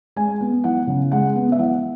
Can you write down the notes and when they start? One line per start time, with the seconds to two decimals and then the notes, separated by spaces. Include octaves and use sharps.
0.16 G#3 G#5
0.41 B3
0.64 E3 F#5
0.87 C#3
1.12 G#3 F#5
1.35 B3
1.52 E5
1.59 E3 F#5